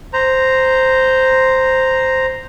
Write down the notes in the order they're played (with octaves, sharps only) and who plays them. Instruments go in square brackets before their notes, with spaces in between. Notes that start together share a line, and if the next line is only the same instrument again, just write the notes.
[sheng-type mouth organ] C5 A#5